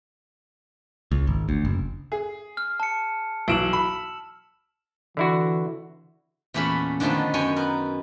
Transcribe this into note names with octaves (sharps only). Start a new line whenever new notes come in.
C#2
G#1
D2
F#1
G#4
F6
A5 C#7
B1 E3 E6 D7 E7 F#7
B5
D3 E3 E4 F#4
E2 A#2 A3 C#4 B5
D3 D#3 F3 A3 B3
F#2 C#5 G5 G#5
B3 A#4